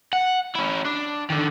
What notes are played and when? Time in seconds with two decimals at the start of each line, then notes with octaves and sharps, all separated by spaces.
0.13 F#5
0.56 C#4 E4
0.86 D4
1.30 D3 D#3